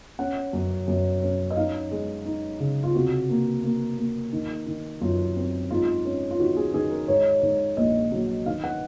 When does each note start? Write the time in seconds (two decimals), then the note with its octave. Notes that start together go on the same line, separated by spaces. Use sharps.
0.19 C#4 F#5
0.53 F#2
0.88 F#2
1.22 C#4
1.51 D#5
1.57 D#4 F5
1.91 G#3
2.26 D#4
2.60 C#3
2.83 F4
2.95 C3 F#4
3.29 A#3
3.64 A#3
3.98 A#3
4.32 D#3
4.66 D#3
5.01 F#2 F4
5.36 C4
5.71 G#2 F4
6.05 C#4
6.31 F4
6.39 D#3 F#4
6.57 G#4
6.74 D#3 G#4
6.91 A#4
7.08 G#2 C#5
7.43 G#2
7.77 A#1 D#5
8.12 F#3
8.46 D#3 F5
8.64 F#5